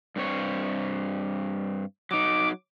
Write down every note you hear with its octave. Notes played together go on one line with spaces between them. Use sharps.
G2 C4 C#5
F#3 D#4 D6